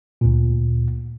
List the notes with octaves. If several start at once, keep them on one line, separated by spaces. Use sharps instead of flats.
D2 A#2